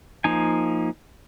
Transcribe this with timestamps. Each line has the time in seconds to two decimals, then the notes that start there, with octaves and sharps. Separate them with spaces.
0.24 F3 A#3 D#4 G#5